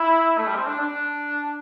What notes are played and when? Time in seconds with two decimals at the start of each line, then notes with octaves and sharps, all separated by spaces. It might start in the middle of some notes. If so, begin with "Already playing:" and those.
Already playing: E4
0.38 A3
0.47 G3
0.56 C4
0.67 D4
0.80 D4